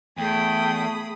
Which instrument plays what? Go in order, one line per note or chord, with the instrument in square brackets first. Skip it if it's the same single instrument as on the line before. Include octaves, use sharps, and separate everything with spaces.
[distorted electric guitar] E2 [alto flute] A3 [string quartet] G#4 B5 D#6 [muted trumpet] G5